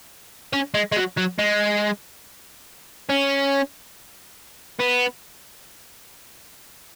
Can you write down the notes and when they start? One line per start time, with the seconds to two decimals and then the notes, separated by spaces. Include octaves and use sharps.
0.53 C#4
0.74 G#3
0.92 G#3
0.96 F#3
1.17 F#3
1.38 G#3
3.09 C#4
4.79 B3